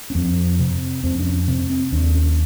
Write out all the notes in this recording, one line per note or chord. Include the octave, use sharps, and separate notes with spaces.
C#4
F2 C4
C3 C4
F2 C4
D4
C#4
C3 C4
C4
D#2 D4
C#4